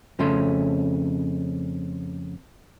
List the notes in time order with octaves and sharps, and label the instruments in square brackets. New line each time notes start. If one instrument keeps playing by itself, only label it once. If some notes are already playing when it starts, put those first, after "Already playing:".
[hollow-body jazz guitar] F2 C#3 A3 C#4 C6